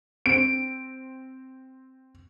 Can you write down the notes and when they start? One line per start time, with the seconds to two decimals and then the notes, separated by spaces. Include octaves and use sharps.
0.26 C4 D7